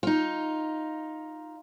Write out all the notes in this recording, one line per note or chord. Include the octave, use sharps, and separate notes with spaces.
D#4 F4